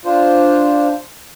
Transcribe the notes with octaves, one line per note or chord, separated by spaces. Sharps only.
D4 F4 C5